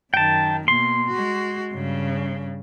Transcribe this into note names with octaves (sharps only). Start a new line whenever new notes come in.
F#2 D#3 G5 A5
B2 A#3 C6
G#3 F#4
G2 C#3